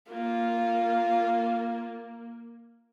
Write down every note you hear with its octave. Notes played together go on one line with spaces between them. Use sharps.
A#3 F4